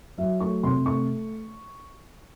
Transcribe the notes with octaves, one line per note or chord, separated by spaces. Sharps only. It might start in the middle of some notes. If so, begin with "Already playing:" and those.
F#3 E5
A3 C#6
C3 C6
A3 C#6